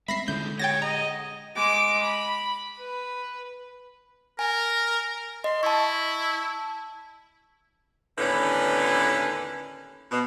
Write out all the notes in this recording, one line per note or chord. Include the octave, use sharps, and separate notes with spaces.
G#3 A#3 C4 E5 B5 A#6 C7
D3 G#3 C#4 E4 G#4 A4 G6
G4 G#4 C#5 F#5 G5 A6 A#6
D#5 A#5
G#3 D6
B5
B4
A#4 G#5
D#5 C6
E4 A5 C#6
D#2 A2 D3 E3 B3 C#4
B2